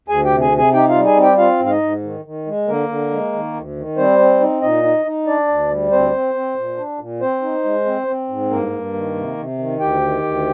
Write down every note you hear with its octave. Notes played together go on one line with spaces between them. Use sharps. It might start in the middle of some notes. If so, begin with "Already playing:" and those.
D2 G#4 G#5
G4 G5
C3
G#4 G#5
C3
G#4 G#5
D#4 G4 G5
F4 F5
G3
G#4 G#5
C4
G4 G5
C4 F4 F5
G#2
F5
D#4 D#5
G#2
D#3
D#3
G#3
D3 A#3 A#4
D3
G#3
D#3
D2
D#3
G3 C4 C5
C4
D#4
A#2 D#4 D#5
D#4
D#4
D4 D5
D2
G3
D2 C4 C5
C4
C4
A#2
D4
A#2
C4 C5
D#4
G#3
C4
C4
G#2
G2 A#3 A#4
G2
D#3
C3
C3
D#3
D2 G4 G5
D#3
D2